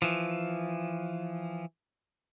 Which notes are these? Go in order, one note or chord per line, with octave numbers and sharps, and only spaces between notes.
E3 F3